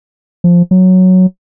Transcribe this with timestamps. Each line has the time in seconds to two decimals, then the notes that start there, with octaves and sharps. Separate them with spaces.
0.44 F3
0.71 F#3